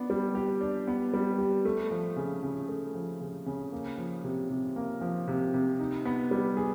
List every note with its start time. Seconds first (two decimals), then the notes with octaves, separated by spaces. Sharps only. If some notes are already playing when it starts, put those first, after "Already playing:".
Already playing: B3 D4
0.10 G3
0.35 G4
0.61 D4
0.87 B3
1.13 G3
1.38 G4
1.65 A3
1.91 F3
2.16 C#3
2.43 C#3
2.69 A3
2.94 F3
3.20 C#3
3.46 C#3
3.72 A#3
3.98 F3
4.24 C3
4.50 C3
4.76 A#3
5.01 F3
5.28 C3
5.54 C3
5.79 D#4
6.05 B3
6.31 G3
6.57 G#4